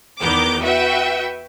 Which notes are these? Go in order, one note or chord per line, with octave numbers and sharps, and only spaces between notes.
E2 D#3 B3 A#4 D6 G6
F#4 B4 E5 F#5 G5